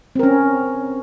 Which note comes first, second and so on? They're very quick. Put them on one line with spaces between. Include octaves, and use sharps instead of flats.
C4 A#4 C#4